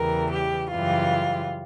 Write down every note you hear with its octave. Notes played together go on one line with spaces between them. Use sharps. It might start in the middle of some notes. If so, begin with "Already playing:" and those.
Already playing: E2 C#3 E3 G3 A#4
G4
F#2 C#3 E3 G3 F4